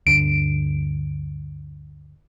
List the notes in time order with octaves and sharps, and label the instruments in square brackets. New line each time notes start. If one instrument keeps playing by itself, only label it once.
[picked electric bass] D2 G2 D3 [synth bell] D7